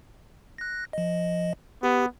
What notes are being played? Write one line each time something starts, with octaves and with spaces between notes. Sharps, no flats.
F#6 A#6
F3 D#5
B3 G4